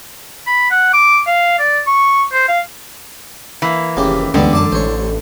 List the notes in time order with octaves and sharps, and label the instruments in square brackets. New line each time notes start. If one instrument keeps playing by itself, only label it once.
[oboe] B5
F#5
D6
F5
D5
C#6
C5
F5
[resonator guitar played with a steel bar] E3 A#3
[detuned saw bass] F1 [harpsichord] D#2 C#3 G4
[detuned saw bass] D2 [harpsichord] G2 G3 B3 [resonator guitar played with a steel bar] D3 [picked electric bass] E3 G#3 C#4
[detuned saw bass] F#2 [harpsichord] D5 A5 D6
[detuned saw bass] A1 [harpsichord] C5 C#5